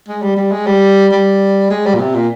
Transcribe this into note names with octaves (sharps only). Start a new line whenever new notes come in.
G#3
G3
G3
G#3
G3
G3
G#3
G3
A#2
C3
A#2